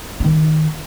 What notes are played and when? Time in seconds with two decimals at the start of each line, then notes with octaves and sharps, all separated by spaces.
0.20 D#3 D#4